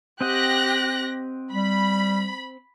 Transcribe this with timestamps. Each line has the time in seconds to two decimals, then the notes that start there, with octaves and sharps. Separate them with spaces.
0.21 C4 G4 D#5 F#5 F#6 A#6
1.52 G3 B5